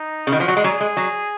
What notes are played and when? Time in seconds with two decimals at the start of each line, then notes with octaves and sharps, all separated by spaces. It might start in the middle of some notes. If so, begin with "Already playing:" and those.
Already playing: D#4
0.27 C#3
0.32 D#3 F#4
0.40 F3
0.48 F#3
0.57 G#3
0.64 F#3 G#4
0.81 G#3
0.97 F#3